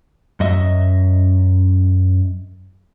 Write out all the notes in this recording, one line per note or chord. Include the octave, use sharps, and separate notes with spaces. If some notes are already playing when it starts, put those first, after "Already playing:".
F#2 D#5 E5